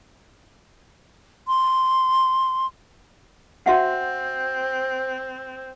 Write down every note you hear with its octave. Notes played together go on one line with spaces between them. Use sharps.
C6
C4 F#4 E5 F#5